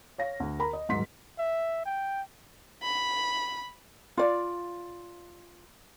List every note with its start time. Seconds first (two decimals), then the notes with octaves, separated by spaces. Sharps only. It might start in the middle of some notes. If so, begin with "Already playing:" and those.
0.18 C#5 F5 A#6
0.40 D2
0.59 A#4 A#5 B5
0.73 D#5
0.89 D#1 G#2 F#3 C6 B6
1.39 E5
1.86 G5
2.83 B5
4.17 F4 D5